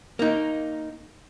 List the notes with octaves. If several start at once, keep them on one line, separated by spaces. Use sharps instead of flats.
A#3 D#4